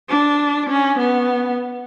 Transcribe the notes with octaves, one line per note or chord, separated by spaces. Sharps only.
D4
C#4
B3